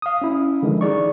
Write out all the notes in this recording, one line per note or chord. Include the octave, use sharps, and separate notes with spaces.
F5 D#6
C#4 E4
D3 D#3 F3 G#3
D#4 G#4 D5 C#6